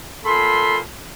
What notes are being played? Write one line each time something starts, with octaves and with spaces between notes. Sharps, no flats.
A#2 A4 B5 C6